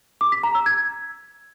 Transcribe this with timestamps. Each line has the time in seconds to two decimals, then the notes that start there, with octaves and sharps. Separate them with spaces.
0.21 D6
0.32 B6
0.43 A#5
0.55 E6
0.66 G#6